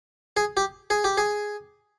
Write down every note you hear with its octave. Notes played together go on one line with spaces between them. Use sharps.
G#4
G4
G#4
G4
G#4